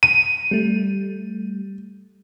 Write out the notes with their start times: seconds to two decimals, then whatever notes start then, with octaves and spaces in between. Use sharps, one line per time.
0.03 D#7
0.51 G3 A3